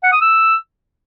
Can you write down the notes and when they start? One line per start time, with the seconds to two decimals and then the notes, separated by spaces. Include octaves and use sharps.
0.04 F#5
0.12 D#6
0.21 E6